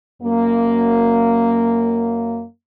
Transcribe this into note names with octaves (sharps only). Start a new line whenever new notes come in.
F#2 A#3